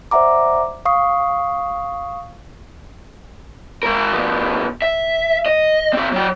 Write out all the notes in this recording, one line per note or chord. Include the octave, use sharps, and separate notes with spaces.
C5 D5 E5 F#5 A#5 D6
F5 C#6 D#6 C7
G#3 A#4
B2 F3
E5
D#5
C4 G#4
F#3 G5